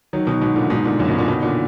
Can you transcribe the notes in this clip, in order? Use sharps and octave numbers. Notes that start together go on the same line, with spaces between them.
D#3 F#3
B2 D#3
G#2 B2
A#2 D3
G#2 B2
A#2 D3
F#2 A#2
G#2 B2
A#2 D3
B2 D#3
A#2 D3